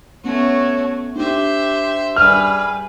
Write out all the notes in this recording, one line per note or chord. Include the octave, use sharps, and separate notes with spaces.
A3 B3 C#4 F#4 C#5
D4 G4 C5 E5
G3 G#4 B4 F6